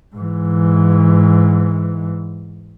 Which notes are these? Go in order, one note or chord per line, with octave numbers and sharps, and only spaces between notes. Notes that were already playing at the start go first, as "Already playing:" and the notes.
G#2 E3